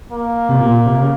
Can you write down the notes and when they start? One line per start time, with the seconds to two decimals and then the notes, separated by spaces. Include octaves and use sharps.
0.11 A#3
0.49 C3
0.61 A#2
0.86 C3
1.01 C#3